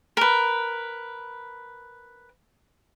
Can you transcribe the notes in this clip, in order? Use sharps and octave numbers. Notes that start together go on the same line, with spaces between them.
A#4 B4